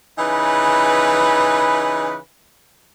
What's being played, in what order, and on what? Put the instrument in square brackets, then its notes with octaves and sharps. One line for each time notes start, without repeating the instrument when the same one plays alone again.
[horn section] C#3 E3 D#4 B4